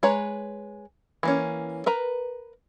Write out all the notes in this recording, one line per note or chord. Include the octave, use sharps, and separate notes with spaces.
G#3 B4 C#5 A#5
E3 A#3 C#4
A#4 B4 A#5